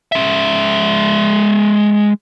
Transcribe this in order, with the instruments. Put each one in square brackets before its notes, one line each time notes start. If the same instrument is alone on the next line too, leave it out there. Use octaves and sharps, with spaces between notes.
[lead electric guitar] G#3 E5